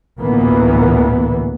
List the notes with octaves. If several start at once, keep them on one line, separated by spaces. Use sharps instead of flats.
A1 D2 A#2 E3 A#3 B3